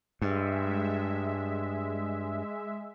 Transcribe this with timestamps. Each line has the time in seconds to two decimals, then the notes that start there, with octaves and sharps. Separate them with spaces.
0.22 G2 G#3 E5